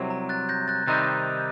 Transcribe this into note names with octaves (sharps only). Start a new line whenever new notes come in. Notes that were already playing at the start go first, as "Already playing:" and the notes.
Already playing: C2 C3 F#3
A#5
F#6 A6
G6 A#6
F#6 A6
C3 D#3 G3 C4 D#4 F#6 A6